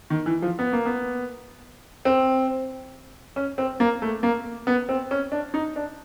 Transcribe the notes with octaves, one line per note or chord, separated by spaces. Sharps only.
D#3
E3
F3
B3
A#3
B3
C4
C#4
C4
A#3
A3
A#3
B3
C4
C#4
D4
D#4
D4